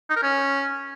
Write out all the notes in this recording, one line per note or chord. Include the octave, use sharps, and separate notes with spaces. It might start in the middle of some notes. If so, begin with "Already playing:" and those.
D#4
A#4
C#4